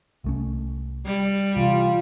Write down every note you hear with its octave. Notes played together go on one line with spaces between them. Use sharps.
C2 A3 C#4
G3
C3 E3 F4